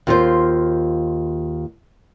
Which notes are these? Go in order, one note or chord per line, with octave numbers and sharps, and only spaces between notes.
D#2 F4 C5